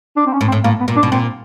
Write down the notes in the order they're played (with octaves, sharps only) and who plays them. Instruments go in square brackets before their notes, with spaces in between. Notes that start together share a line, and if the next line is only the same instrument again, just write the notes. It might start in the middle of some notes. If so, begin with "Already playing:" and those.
[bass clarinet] D4
C4
C#4
[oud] A2
[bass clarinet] C4
[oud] A2
[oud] A2 [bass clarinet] A#3
[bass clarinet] B3
[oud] A#2
[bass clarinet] D4
[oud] B2
[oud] A#2 [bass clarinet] C4